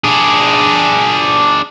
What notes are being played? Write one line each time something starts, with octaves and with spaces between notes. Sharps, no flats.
D4 G#4